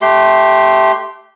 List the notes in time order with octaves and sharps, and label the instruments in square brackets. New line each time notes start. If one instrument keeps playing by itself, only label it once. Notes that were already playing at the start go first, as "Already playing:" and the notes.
[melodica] A3 G4 C6